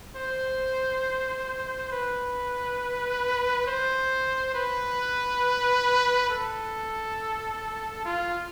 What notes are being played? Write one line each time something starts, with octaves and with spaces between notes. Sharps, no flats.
C5
B4
C5
B4
A4
F4